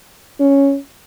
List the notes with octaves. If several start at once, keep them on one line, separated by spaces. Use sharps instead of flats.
C#4